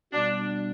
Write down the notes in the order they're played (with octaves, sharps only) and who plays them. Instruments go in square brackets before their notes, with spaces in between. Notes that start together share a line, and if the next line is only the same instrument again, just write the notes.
[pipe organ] B2 G3 B3 [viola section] D4